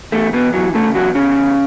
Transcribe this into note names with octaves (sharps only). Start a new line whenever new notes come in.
E2 A3
E2 B2 B3
E3 F#3
C#3 A3
E2 F#3 F#4
E2 C#3 C#4
E2